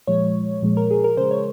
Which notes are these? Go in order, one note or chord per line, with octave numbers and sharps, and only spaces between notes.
A#2 F3 G#3 C#5
A#2 F3 G#3
A#4
G#4
A#4
C#3 G#3 C5
C#5